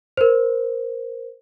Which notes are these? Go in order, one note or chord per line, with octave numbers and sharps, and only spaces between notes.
A#4 C5